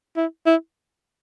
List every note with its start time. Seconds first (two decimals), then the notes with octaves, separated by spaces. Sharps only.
0.17 E4
0.46 E4